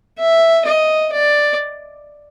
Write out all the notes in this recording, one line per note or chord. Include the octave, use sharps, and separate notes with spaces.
E5
D#5
D5